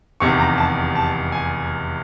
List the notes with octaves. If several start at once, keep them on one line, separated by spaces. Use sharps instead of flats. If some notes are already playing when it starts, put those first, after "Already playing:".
F1 E2 C3 D#3 C#6
A#5
A5
A5
G#5